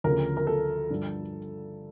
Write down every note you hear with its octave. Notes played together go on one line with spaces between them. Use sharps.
D2 C#3 F3 A#4
A#4
A4
G2 D3 F3